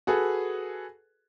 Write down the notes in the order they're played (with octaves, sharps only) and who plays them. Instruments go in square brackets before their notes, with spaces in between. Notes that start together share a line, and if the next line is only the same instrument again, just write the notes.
[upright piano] F#4 G#4 A4 B4